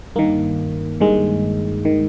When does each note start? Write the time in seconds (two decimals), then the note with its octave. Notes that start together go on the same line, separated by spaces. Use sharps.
0.16 G2 D#3 A#3
1.01 G2 D#3 G#3
1.85 D#3